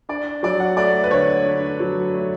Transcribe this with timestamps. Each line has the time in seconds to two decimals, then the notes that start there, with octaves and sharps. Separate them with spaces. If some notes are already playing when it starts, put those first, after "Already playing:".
0.09 D4 D5
0.43 F#3 D5
0.60 F#5
0.77 A3 D5
1.04 B4
1.11 D3 C#5
1.45 D4
1.80 F#3
2.14 A3